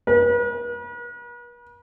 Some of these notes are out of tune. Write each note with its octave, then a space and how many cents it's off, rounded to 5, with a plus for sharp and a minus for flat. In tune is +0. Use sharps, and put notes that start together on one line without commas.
B4 -45